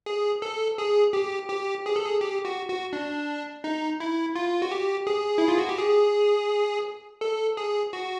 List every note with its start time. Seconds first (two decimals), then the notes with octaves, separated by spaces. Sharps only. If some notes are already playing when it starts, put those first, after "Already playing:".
0.06 G#4
0.42 A4
0.78 G#4
1.13 G4
1.49 G4
1.86 G#4
1.96 A4
2.06 G#4
2.21 G4
2.45 F#4
2.69 F#4
2.93 D4
3.64 D#4
4.00 E4
4.36 F4
4.62 F#4
4.71 G4
5.07 G#4
5.38 E4
5.48 F4
5.58 F#4
5.69 G4
5.79 G#4
7.21 A4
7.57 G#4
7.93 F#4